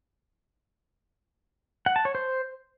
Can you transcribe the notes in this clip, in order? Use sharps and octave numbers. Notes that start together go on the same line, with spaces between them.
F#5
A5
C#5
C5